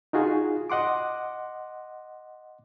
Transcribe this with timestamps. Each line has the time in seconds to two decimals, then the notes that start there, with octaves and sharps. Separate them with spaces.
0.13 D#4 F4 F#4 G#4
0.70 D#5 F#5 C6 D6